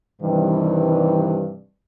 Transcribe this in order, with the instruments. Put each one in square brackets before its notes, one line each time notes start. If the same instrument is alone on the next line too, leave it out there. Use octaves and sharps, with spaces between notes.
[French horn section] G2 C3 D#3 E3 G3